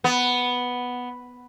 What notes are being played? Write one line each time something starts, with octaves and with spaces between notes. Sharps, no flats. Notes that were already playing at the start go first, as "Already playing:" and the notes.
B3